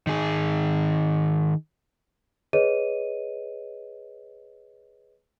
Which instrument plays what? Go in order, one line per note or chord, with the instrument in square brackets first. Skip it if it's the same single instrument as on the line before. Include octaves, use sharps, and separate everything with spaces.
[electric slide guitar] D#3 G#4
[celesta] G#4 B4 C#5 D#5 D#7